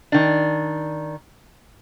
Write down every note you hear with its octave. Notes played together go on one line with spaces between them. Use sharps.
D#3 D4